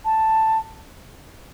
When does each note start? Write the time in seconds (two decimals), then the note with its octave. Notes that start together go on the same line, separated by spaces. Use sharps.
0.05 A5